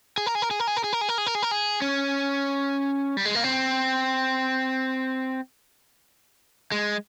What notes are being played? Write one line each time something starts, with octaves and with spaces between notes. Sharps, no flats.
G#4
A#4
G#4
A#4
G#4
A#4
G#4
A#4
G#4
A#4
G#4
A#4
G#4
A#4
G#4
A#4
G#4
C#4
G3
G#3
A#3
C4
G#3